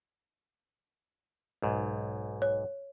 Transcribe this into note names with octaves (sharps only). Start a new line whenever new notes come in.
B1 G#2
C#5